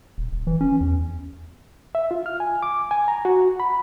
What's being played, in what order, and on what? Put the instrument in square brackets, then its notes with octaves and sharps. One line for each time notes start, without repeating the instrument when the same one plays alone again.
[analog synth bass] D#1
D#1
E3
C#4
E2
[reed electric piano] E5
F4
F6
G#5
D6
G#5
A#5
F#4
B5